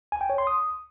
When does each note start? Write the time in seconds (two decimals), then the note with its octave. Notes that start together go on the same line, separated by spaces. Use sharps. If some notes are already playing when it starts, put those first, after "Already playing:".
0.12 G#5
0.21 G5
0.30 C#5
0.38 C6
0.47 D#6